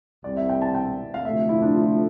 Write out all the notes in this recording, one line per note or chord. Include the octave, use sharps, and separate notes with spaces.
C2 C3 G3 C4 D5
E5
G5
A5
G5
F5
D2 C3 F3 A3 E5
E4
D4
F4